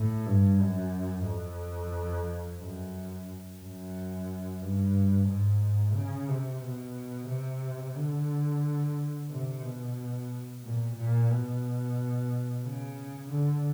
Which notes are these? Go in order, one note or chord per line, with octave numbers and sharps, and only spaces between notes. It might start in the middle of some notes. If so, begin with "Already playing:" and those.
Already playing: A2
G2
F#2
F2
F#2
F#2
G2
G#2
C#3
C3
B2
C3
D3
C3
B2
A#2
A#2
B2
C#3
D3